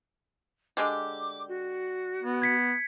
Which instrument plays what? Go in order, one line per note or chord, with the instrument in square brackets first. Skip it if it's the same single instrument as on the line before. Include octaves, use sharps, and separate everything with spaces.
[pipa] D3 G#3 G4 [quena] D6
[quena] F#4
[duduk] B3
[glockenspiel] G#6 B6 C#7